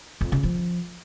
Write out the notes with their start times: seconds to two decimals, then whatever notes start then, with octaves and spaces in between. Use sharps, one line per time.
0.21 F2
0.32 C#3
0.43 F3